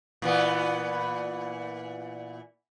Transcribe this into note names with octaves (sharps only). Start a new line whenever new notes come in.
A#2 E3 B3